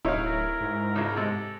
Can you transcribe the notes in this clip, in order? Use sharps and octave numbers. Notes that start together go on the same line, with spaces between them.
D1 D#4 E4 C#5 F5
A#4
G#2
C#2 C#3
C3 G#3 A4